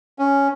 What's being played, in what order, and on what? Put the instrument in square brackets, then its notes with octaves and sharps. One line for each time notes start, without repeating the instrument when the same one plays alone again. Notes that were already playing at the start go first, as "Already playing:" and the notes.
[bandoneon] C#4